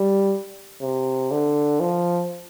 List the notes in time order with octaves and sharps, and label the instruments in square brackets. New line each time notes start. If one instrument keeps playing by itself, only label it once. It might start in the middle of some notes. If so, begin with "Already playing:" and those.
Already playing: [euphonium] G3
C3
D3
F3